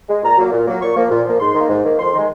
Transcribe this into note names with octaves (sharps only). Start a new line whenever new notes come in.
G#3
A#2 A#5
F#3 A#3
A#2
F#3 A#3
A#2 C#6
F3 A#3
A#2
F3 A#3
G#2 C6
D#3 A#3
G#2
D#3 A#3
F2 C6
D#3 G#3